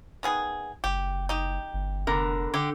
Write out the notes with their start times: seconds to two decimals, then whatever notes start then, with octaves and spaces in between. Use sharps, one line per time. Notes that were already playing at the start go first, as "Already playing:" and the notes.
0.23 D#3 B3 G#4
0.84 F#1 G4
1.29 D#4 G4
1.73 G1
2.07 F1 D3 B3 A#4
2.54 D3 G4